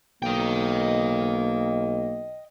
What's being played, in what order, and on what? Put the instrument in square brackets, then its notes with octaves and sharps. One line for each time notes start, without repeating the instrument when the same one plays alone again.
[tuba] B1 [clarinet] A#3 [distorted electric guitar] D#5 G5